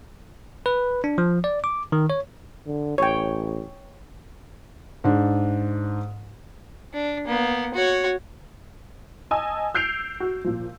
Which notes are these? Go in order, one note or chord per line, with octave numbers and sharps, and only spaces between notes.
B4
D4
F3
D5
D6
D#3
C#5
D3
A1 C#5 G5
G#2 D4
D4
A#3 B3
F#4 C#5
D#5 G#5 A5 D#6 E6
E6 G6 C7 D7 F7
F#4
A#2 F3